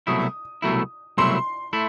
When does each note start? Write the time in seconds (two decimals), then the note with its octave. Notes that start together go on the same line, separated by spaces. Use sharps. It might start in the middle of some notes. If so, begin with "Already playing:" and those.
0.07 C2 B2 F#3 A3 E4 D#6
0.62 C2 B2 F#3 A3 E4
1.17 C2 B2 F#3 A3 E4 C6
1.73 A3 E4